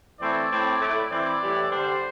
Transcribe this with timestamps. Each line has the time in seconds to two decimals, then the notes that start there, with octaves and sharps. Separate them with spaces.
0.20 E3 A3 C4 E4 D5
0.50 A2 A3 C4 E4
0.80 A2 A3 E4
1.10 E3 C4 E4 D5
1.40 A2 E3 G3 E4
1.70 D3 G3 D4 C5